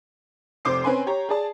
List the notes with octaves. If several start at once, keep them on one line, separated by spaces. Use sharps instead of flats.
F1 C3 C5 D6 C7
C4 C#4 B4 G#5 C6
G4 C#5 A#5
G#4 D5 A5